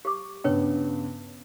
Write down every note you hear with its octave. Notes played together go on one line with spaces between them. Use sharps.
G4 D6
G2 C#3 B3 B4 C#5 G5